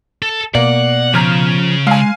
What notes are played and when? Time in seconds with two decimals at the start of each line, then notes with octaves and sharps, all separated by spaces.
0.22 A4
0.55 B2 A#3 D5 F#5
1.14 C#3 F3 A#5 F6 G#6
1.87 G#3 F5 G#5